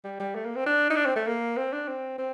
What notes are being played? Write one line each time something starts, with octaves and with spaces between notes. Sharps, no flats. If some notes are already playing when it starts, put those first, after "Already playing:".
G3
G3
A3
A#3
C4
D4
D#4
D4
C4
A3
A#3
C4
D4
C4
C4